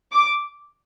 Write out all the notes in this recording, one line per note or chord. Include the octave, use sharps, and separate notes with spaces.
D6